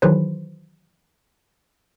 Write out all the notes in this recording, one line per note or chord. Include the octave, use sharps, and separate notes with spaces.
D#3 E3 F#3 G#4 B4 C5